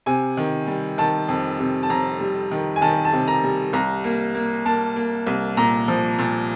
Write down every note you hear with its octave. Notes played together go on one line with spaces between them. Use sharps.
C3 G#5
D#3
G3
D#3 A5
F2
C3
A5
F2 A#5
G3
D#3
G#5
D#3 A5
A5
C3
A#5
G3
C2 A#5
A#3
A#3
A#3 A5
A#3
C2
A#2 A#5
F3
A#2